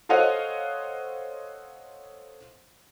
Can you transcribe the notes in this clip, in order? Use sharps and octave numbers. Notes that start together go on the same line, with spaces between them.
A4 C5 C#5 D#5 F5 F#5